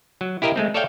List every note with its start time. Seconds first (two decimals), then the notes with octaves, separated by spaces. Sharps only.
0.21 F#3
0.42 E4 G4 A#4 D#5 F5
0.56 G#3 A3 C4
0.74 A4 C#5 D5 E5 F5 G5